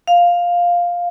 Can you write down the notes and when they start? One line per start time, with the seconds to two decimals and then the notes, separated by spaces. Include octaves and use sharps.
0.07 F5